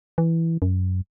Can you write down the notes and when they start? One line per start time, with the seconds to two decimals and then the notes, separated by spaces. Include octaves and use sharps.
0.18 E3
0.62 F#2